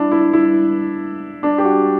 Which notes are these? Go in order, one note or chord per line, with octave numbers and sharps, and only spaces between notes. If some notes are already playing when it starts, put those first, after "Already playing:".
Already playing: D4 E4
E4
E4
D4
G4
F#4